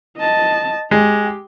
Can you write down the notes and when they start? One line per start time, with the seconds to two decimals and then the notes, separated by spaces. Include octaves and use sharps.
0.17 D#5 A5
0.91 G#3 G4